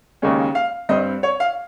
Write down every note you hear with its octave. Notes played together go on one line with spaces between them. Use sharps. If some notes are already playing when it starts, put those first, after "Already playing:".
D#2 C#3 G#3 C#4
F5
G2 G3 C4 D#5
C#5
F5